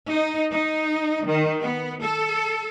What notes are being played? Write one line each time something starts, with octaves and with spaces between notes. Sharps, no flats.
D#4
D#4
D#3
B3
A4